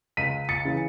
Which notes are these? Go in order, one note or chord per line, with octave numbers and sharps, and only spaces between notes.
C#2 B6 D#7
A6 C#7
C#3 E3